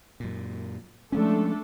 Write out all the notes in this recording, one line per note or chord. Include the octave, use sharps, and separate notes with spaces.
F#2 A#2
F3 G#3 A3 C#4 D4 A4